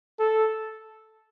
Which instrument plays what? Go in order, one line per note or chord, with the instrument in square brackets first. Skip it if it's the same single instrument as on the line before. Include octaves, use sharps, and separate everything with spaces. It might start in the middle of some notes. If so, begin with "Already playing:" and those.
[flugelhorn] A4